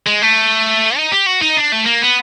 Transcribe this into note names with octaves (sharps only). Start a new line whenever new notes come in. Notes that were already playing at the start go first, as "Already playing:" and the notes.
G#3
A3
D#4
G4
F#4
D#4
D4
A3
A#3
B3